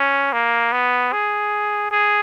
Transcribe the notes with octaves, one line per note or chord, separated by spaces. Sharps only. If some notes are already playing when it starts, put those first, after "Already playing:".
Already playing: C#4
A#3
B3
G#4
G#4